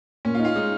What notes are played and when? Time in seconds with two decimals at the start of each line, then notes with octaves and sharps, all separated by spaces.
0.25 A#2 C#4
0.35 F4
0.39 D#4
0.45 F4
0.55 G#3 D#4